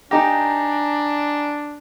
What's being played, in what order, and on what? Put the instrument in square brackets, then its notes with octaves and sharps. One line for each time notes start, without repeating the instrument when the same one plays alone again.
[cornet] D4 [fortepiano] D#4 G4 [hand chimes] G#5 A#5 A#6